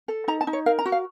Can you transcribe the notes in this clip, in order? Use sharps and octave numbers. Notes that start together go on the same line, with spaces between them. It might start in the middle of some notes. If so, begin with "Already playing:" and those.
A4
D#4 A#5
A5
D#4
C#5
A#4 F5
A#5
F#4
F5